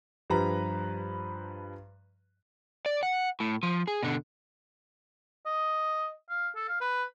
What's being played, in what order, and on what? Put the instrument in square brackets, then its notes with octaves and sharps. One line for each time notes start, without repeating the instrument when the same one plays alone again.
[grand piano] G2 F3 G3 B4 A#5 B5
[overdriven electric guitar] D5
F#5
A2
F3
G#4
B2 D3
[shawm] D#5
F5
A4
F5
B4